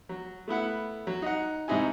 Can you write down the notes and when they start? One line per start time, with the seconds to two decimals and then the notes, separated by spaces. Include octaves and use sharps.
0.09 F#3
0.48 A3 B3 E4 F#5
1.07 F#3
1.22 D#4 F#5
1.68 G#2 C3 C4 D#4 E4 G#5